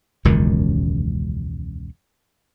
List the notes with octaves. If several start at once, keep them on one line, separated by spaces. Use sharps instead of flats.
E1 C#2 F#2 D#3